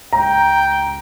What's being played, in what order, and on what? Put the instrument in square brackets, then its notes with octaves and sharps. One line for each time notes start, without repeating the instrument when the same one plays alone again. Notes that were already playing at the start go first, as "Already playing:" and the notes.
[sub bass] C#2 [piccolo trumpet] G5 [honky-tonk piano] A#5